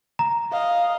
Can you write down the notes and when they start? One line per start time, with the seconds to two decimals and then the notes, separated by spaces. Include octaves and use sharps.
0.19 A#5
0.52 D#5 F5